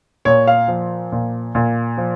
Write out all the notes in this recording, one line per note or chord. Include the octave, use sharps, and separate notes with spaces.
A#2 C#5
F5
F3
A#2
A#2
F3